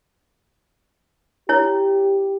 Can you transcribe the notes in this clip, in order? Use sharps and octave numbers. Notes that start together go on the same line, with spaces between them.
E4 G4 C#5